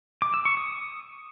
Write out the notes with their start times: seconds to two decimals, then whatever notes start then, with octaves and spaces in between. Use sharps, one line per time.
0.22 D6
0.34 E6
0.45 C#6
0.57 D#6